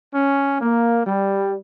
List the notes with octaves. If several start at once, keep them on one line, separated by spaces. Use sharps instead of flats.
C#4
A#3
G3